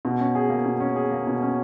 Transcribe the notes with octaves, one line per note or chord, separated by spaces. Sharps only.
B2
C#4
G#4
A#3
B2
C#4
G#4
A#3
B2
C#4